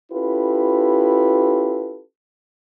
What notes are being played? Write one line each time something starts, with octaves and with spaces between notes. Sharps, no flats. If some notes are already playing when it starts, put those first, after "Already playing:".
C#4 E4 F4 G4 A4 B4